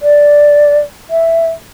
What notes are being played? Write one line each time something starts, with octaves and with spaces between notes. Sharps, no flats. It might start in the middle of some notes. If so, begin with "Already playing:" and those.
D5
E5